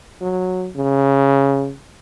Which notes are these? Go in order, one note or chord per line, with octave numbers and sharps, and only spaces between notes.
F#3
C#3